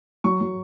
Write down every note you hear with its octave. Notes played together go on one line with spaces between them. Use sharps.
F#3 C#6
F#3